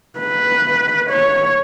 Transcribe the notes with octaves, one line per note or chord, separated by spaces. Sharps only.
B4
C#5